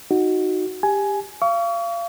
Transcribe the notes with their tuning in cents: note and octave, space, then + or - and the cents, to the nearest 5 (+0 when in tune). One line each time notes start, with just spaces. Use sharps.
D#4 +10 F#4 +0
G4 +20 G#5 +15
F5 -30 C#6 +40